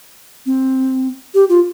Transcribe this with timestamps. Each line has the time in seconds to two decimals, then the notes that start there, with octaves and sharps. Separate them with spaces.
0.46 C4
1.34 G4
1.49 F4